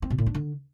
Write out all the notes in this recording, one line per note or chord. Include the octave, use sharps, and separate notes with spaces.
C4
B2
A2
D4
D3